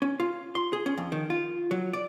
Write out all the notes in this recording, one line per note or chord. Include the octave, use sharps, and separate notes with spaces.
C#4
F4
C6
G#4
C#4
F2
D#3
F4
F#3
D5